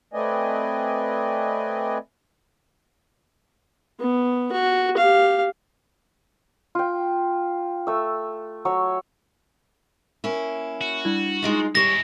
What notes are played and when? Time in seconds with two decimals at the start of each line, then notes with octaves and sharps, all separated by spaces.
0.14 A3 C4 B4 D5 D#5 G#5
4.00 B3
4.52 F#4
4.97 G4 F5
6.75 F4 G5
7.87 A3 E6
8.65 F#3 C#5 E6
10.24 A#3 C#4 E4
10.81 F#4
11.05 G3 D4 E4
11.42 G#3 D#4 F4
11.75 G3 G#3 E4 C#5 A#6